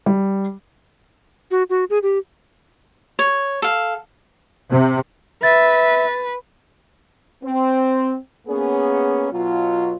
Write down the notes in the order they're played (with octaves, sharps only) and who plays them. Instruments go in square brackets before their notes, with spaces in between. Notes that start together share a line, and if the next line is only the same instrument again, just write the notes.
[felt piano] G3
[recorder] F#4
F#4
G#4
G4
[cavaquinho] C#5
A4 F5
[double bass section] C3
[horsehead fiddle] B4 [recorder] E5 [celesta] A6
[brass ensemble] C4
A#3 B3 C#4 G#4
B2 F#3 F4